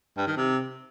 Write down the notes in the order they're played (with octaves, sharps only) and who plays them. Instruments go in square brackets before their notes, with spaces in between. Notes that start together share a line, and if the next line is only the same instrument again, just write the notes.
[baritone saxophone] G2
D#3
C3